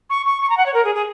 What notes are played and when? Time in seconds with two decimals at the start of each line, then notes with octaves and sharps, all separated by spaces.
0.10 C#6
0.26 C#6
0.42 C#6
0.50 A#5
0.57 F#5
0.66 C#5
0.74 A#4
0.85 G#4
0.95 G#4